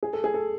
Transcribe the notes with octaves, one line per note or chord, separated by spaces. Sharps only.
G#4
A4
G#4
A4